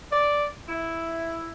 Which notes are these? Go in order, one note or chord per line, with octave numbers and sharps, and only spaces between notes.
D5
E4